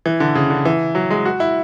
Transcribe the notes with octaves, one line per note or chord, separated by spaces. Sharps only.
E3
D3
C#3
D3
E3
F#3
G#3
F#4
E4